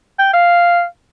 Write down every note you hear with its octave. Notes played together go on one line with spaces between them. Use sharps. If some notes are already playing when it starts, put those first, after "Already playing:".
G5
F5